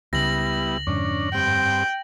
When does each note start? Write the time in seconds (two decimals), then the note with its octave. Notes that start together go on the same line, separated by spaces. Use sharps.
0.13 C#2 C#3 G3 B3 E4 A#6 F#7
0.87 F2 G#2 D3 C#4 D4
1.34 G2 C4 G5